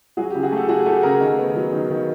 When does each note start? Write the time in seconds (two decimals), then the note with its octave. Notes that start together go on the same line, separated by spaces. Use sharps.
0.17 F#3 F#4 G#4
0.30 G4
0.35 C#3
0.43 F#4 G#4
0.52 A3 G4 A4
0.68 A3 F#4 G#4
0.86 A3 G4 A4
1.03 C#3 G#4 A#4
1.21 D#3
1.38 B3
1.55 F#3
1.72 D#3
1.90 D#3